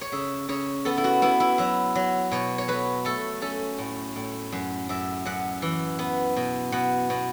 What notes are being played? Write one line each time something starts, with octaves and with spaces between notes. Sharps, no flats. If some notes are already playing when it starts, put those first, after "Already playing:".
C#5
C#3 E5
C#3 C#5
B3 A4
E4
F#4
B3 E4
E4
F#3 E5
F#3
B2 C#5
C#5
F#3 B4
A3 A4
C#4 A4
A2
A2
F#2
F#2 E5
F#2 F#5
E3
B3
B2
B2 F#5
B2